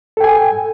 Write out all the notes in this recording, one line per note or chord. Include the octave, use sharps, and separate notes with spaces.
A4 G5 G#5